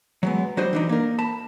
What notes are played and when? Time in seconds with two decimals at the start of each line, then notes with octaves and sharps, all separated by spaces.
0.23 F#3 G#3 B3
0.57 F#3 G3 D4 F#4 C5 D#5
0.73 E3 D4 D#4
0.89 A#3 A#4
1.19 A5 B5